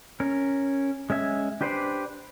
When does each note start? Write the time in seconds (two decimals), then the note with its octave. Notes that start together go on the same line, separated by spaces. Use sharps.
0.20 C#4 A#4
1.10 G#3 C#4 E5 G#5
1.61 D4 G4 B4 C5 D5